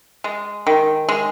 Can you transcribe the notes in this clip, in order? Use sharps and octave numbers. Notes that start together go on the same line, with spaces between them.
G#3
D#3
G#3